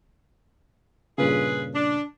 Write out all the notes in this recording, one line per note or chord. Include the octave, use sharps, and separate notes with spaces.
G2 A#2 C#3 F4 G#4 B4
D4